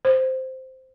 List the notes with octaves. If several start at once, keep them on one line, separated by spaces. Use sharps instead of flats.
C5